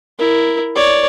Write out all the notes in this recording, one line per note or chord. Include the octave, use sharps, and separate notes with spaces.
E4 A#4
C#5 D5